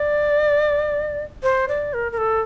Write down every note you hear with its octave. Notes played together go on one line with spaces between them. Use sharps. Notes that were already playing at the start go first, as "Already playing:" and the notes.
Already playing: D5
C5
D5
A#4
A#4
A4